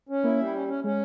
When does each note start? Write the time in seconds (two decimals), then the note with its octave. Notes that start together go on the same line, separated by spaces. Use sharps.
0.09 C#4
0.23 A#3 E4
0.39 G3
0.54 C#4
0.68 C#4
0.84 G#3 C#4